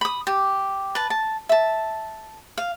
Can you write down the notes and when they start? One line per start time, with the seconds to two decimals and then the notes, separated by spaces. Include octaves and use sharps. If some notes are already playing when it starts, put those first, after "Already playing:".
0.01 B5 D#6
0.27 G4
0.95 B4 A5
1.10 A5
1.49 E5 A5
2.57 F5